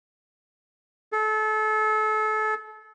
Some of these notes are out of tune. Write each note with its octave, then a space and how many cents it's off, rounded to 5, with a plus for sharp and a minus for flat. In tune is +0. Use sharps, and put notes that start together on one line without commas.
A4 -30